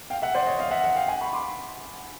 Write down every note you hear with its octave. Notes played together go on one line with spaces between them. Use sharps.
F5 G5
E5 F#5
C5 D5
C#5 D#5
D#5 F5
E5 F#5
E5 F#5
F5 G5
F#5 G#5
B5 C#6
C6 D6